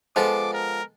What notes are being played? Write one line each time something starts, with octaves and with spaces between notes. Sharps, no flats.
F3 G#3 B3 A4 D6
A#4